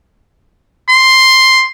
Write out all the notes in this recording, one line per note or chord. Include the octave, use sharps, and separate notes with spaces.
C6